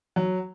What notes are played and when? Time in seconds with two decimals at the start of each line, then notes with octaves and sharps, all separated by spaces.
0.16 F#3